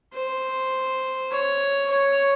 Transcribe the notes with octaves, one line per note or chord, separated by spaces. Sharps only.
C5
C#5
C#5